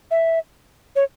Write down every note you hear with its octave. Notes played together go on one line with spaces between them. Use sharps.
E5
C#5